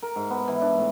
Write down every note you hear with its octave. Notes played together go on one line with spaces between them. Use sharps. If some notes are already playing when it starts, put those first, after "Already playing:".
A#4
G#2
B3
E3
D4
A2